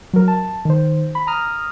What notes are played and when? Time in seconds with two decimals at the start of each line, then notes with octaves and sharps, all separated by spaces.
0.13 F#3 A#4
0.28 A5
0.65 D#3 C5
1.15 B5
1.27 A#5 D#6 F6